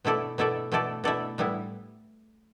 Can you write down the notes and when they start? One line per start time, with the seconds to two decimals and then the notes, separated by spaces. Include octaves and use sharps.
0.05 B2 A3 E4 A4 D5
0.38 B2 A3 E4 A4 D5
0.72 B2 A3 E4 A4 D5
1.04 B2 A3 E4 A4 D5
1.38 A2 G3 B3 E4